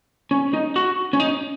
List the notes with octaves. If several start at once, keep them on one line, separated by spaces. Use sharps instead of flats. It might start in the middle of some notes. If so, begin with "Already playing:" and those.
C#4
D#4
F#4
C#4
D#4